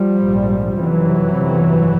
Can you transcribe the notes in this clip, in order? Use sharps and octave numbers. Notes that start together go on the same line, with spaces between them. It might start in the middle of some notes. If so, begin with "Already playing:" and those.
Already playing: F3 G3
A#1 G#2
F#1 F2 C3 E3 F#3
G1 F2 C3